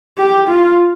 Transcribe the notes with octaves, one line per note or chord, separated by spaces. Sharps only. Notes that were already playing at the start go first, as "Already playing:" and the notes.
G4
F4